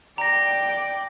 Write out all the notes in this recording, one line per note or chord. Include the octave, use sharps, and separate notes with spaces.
D5 G5 A#5 A#6